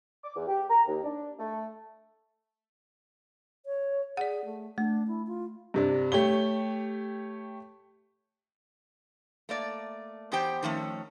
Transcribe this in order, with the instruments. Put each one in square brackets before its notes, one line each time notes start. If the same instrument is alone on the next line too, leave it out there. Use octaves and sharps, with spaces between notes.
[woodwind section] D6
E2
G4
A#5
D#2
D4
A3
[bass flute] C#5
[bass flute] G#4 [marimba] D5 F#5
[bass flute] A3
[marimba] A3 [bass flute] D4
[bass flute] E4
F4
[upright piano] G2 C3 D4
A3 G4 C#5 G7
[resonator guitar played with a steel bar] A3 A#3 D5
E2 B3 G4 C5 G5
D#3 F3 A3 C#4